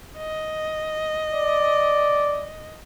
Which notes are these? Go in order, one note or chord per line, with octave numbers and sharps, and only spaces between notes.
D#5
D5